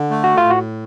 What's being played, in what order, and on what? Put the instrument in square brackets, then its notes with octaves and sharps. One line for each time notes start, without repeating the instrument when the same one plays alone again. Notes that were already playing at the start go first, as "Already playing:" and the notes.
Already playing: [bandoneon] D3
A3
[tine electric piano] F#4
F4
[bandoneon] A2
[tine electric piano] F#4